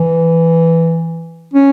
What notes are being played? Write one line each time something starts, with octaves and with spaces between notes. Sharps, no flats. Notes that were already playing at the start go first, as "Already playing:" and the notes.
Already playing: E3
C#4